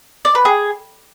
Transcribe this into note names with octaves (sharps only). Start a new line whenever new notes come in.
D5
B4
G#4